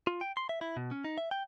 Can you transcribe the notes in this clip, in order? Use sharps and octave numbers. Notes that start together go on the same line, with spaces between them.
F4
G5
C6
E5
E4
B2
C#4
D#4
E5
G5